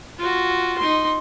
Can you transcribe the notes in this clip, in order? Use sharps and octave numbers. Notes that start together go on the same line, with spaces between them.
F4 F#4
D#4 C6